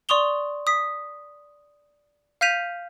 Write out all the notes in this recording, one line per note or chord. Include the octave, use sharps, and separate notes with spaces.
D5 C6 C#6 D#6 F7 G7
D#6 B6
F5 F6 G6 B6 D#7 F7